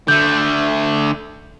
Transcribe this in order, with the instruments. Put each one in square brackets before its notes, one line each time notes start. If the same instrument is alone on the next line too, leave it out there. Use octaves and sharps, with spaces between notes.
[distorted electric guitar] D3 A3 [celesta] G6